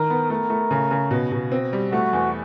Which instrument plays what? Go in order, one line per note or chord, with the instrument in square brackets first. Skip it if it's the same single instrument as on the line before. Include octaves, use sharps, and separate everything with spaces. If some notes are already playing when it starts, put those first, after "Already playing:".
Already playing: [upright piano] D#3 [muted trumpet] A#4
[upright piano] B3
[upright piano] A3 [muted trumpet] A#4
[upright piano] A3
C#3
C#3
B2
B2
C4
G3
[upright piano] A3 [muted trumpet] F#4
[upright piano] E2